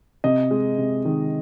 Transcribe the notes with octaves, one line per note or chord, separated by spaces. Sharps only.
C3 D#5
G#3
C3
D#3